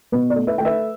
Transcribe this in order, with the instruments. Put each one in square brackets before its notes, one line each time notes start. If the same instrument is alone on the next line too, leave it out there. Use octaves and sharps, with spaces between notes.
[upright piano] B2 B4
D5
A3
B4 E5
A3 G5
B4 E5